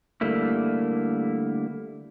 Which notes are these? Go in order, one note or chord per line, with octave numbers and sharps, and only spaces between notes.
D3 G3 A3 A#3 E4